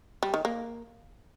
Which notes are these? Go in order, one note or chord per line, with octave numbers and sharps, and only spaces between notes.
G3
D#3
A#3